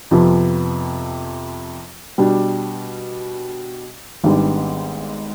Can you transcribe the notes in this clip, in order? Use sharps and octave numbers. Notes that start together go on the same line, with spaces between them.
F2 C3 F3 B3
B2 G3 D4
G#1 G#2 G3 B3 D4